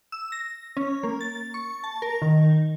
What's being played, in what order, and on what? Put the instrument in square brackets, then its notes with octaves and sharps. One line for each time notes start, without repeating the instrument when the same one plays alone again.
[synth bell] E6
A#6
C#4
A#3
A6
C#6
A5
A#4
D#3